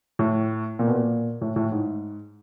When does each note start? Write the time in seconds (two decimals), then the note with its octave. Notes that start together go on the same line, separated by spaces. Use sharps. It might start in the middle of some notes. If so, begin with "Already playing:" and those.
0.19 A2
0.79 A#2
0.88 B2
0.95 A#2
1.41 A2
1.56 A2
1.72 G#2